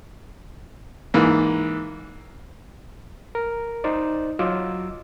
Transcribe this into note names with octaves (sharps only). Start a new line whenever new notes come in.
G#2 E3 A#3
A#4
D#4 C5 D5
F#3 F4 D#5 D6 E6